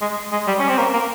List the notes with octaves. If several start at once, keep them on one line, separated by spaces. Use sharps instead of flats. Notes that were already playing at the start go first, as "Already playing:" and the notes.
G#3
G#3
G3
C#4
C4
A#3
A#3